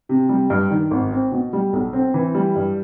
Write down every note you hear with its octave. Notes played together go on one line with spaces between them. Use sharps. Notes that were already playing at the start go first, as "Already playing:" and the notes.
C3
G3
G2
D#3
G#1
C4
B2
G3
B1
C4
E3
G3
G2